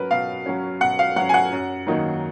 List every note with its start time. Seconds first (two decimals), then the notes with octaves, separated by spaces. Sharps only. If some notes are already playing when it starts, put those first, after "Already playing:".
Already playing: F#3 C#4 A#4 B4
0.11 B2 F5
0.46 F#3 C#4
0.81 B2 F#5
0.99 F5
1.16 F#3 C#4 F#5
1.29 G#5
1.34 F#5
1.52 F#2
1.87 D#3 F#3 A#3 D#4